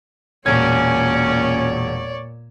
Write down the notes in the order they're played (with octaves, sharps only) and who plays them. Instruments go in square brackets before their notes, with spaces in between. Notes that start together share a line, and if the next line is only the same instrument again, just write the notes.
[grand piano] E1 G#6 [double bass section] A#2 [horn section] C#4 [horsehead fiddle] C#5 D5